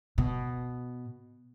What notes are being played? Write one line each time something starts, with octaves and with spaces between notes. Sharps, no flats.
B2